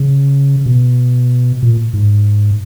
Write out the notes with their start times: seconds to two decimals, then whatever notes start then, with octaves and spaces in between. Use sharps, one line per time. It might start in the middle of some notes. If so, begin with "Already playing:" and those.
Already playing: C#3
0.66 B2
1.63 A#2
1.93 G#2